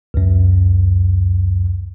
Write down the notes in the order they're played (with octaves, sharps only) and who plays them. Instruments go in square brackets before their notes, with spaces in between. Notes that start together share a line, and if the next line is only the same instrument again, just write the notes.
[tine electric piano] C#2 F#2